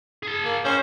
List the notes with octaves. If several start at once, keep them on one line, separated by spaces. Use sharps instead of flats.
G#4 A5
A#3
C#4 C5